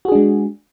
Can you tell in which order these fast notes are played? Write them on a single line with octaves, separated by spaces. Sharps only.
F#4 G#4 D4 G#3